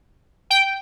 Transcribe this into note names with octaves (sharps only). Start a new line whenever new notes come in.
G5